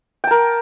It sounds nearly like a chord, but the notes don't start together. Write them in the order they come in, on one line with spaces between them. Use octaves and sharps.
G5 A5 A#4